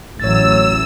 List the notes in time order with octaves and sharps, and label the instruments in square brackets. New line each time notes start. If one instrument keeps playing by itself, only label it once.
[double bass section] A1 E3 [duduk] F#3 [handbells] C#5 A6 [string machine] E6